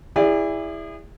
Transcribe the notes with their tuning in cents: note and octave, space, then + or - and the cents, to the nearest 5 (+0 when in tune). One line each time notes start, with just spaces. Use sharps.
E4 +0 G#4 -35 D5 -5